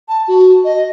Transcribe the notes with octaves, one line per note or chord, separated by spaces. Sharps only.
A5
F#4
D#5